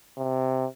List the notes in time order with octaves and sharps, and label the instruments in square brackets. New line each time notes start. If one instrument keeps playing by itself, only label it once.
[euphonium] C3